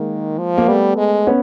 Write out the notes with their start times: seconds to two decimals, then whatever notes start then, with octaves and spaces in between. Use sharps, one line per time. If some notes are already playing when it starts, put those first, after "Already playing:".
Already playing: D#3 G#3 A#3
0.38 F3
0.58 A#3
0.68 G3 A3 B3
0.97 G#3
1.27 B3 C#4